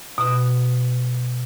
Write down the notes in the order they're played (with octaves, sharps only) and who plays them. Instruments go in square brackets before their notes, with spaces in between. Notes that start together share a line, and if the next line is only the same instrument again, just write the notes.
[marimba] B2